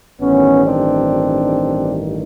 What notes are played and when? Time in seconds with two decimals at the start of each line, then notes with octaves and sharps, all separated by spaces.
0.22 A1 G2 D#3 B3 C#4
0.66 C4 D4